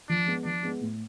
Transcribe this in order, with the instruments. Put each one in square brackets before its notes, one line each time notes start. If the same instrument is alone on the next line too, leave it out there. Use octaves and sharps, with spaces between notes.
[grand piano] F3 [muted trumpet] D4
[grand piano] G#3 B3
[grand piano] F3 [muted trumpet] D4
[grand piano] G#3 B3
A2